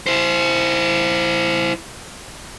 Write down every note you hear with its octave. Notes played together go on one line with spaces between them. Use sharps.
E4 C5